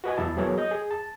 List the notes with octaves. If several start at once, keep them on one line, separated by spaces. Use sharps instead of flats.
F#4 B4 D#5 G#5
E2 E4 A5
E3 F#3 B3 G#4 A#4 C#5
D#5 D#6 G6
G#4
A5